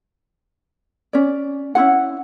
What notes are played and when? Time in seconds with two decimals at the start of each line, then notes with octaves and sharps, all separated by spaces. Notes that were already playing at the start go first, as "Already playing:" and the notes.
1.13 C#4 D5
1.75 C#4 E4 F4 F#5